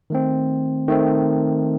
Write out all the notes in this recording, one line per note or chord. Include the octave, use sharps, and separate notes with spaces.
D#3 A3 C4
D#3 A3 C4